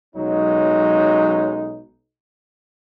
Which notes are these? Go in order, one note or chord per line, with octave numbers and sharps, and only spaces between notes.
B1 F#3 G#3 C#4 D#4